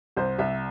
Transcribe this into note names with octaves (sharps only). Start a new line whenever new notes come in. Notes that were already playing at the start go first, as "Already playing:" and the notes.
C2 C5
C2 E5